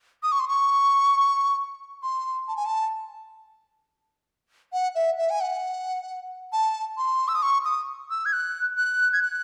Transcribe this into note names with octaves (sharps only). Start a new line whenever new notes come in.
D#6
C#6
C6
C#6
C6
A5
G#5
A5
F#5
E5
E5
G#5
F#5
A5
C6
E6
D#6
C#6
D#6
E6
G#6
F#6
F#6
G#6
F#6